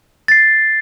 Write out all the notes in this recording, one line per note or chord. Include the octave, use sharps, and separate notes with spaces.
A6 C7